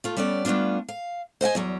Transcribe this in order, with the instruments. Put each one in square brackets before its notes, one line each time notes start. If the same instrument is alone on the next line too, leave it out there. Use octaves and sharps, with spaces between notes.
[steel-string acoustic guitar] A3 F4
G3 B3 C#4 A4 D5
G3 A3 B3 D4 F4
F5
C5 D#5 F#5 G#5
E2 F#3 G3